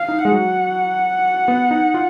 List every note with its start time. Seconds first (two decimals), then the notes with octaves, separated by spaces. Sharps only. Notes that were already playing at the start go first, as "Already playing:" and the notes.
Already playing: F5
0.08 D#4
0.24 G#3 F#5
0.32 F#3
1.48 B3
1.71 D#4
1.94 F4